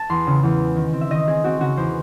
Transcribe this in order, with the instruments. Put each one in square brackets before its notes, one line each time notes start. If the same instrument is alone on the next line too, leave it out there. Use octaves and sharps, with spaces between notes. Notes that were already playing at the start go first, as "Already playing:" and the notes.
Already playing: [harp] A5
E2 C6
C#3
E2
G#3
D#3
C4
E5
D#3 D#5
C4 G#4
C4 F#4
C#3 F#4
E2 C5